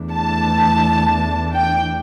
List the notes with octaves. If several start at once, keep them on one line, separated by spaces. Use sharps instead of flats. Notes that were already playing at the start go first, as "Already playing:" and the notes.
Already playing: E2 E3 A3 D4
A5
G5